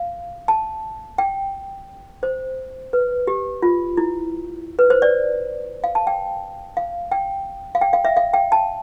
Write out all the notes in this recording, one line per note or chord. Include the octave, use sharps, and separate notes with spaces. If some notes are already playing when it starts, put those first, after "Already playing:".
Already playing: F5
A5
G5
C5
B4
G4
F4
E4
B4
C5
D5
F5
A5
G5
F5
G5
F5
G5
F5
E5
F5
G5
A5